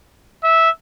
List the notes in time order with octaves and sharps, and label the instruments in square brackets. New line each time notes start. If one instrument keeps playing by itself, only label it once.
[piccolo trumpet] E5